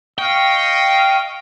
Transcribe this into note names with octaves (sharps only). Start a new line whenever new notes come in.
D#5 F5 G5 C#6